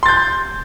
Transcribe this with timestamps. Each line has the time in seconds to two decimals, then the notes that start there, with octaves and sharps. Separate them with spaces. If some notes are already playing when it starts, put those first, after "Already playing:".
0.03 C6
0.06 A6
0.08 G6